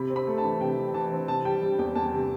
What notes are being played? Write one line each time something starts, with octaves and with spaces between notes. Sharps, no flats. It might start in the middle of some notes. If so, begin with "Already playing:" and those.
Already playing: C3 B5
C4
B5
A3
A5
E3
C3 G5
E3
E3 A5
C4
C3 A5
G3 G5
G3
E2 G5
E2 A5
C3